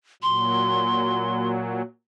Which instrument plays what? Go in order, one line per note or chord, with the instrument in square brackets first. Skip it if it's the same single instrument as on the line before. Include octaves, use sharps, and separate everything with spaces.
[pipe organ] A#2 F#3 [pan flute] C6